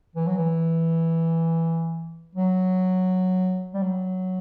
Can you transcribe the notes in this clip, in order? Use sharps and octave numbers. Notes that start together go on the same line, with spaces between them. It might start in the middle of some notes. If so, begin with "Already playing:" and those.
E3
F#3
E3
F#3
G3
F#3